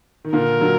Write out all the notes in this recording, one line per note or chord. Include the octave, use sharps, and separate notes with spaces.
D#3
A#2 D3 A#4
D3 F#3